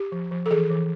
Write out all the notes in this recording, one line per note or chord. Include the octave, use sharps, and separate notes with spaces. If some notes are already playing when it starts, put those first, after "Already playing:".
Already playing: G4
F3
F3
A4
E3 G#4
E3